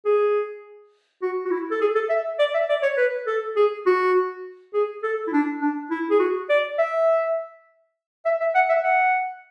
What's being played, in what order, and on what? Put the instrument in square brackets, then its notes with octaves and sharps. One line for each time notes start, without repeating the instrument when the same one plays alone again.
[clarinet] G#4
F#4
F#4
E4
A4
G#4
A4
E5
D5
E5
D5
C#5
B4
A4
G#4
F#4
G#4
A4
E4
D4
D4
E4
G#4
F#4
D5
E5
E5
E5
F#5
E5
F#5